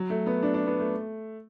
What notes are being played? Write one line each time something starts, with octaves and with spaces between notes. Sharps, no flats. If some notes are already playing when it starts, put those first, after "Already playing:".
Already playing: F#3
A3
B3
D4
D4
B3
A3